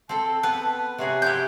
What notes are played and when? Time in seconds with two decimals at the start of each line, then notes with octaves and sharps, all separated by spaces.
0.09 C4 A4 A5
0.43 B3 B4
0.98 C3 F#4 G#4 C#5
1.22 C4 E4 G4 G6